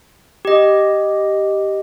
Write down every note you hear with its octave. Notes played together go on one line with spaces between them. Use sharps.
G4 D#5